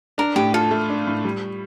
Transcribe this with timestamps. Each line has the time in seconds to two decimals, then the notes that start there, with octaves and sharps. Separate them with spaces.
0.18 D4 A#4
0.36 A2 G4
0.54 F4 A4
0.71 A3
0.89 D4
1.07 A2
1.25 G3